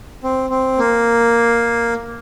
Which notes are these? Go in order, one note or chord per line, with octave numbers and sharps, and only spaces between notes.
C4
C4
A#3